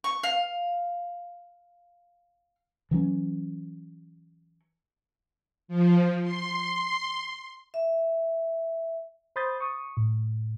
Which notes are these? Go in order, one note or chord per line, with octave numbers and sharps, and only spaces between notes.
C#6
F5
E3 F#3 C4 C#4
F3
C6
E5
C5 B5 C6 D#6 G6 A6
C#6 D#6
A2